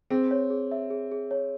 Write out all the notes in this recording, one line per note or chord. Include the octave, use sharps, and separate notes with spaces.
C4 G#4
C#5
G#4
E5
G#4
G#4
C#5